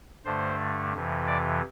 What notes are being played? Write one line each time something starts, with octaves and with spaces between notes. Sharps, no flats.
G2 D3 A3 C5
F2 C3 E3
D5